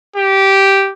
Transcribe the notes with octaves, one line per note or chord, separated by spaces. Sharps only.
G4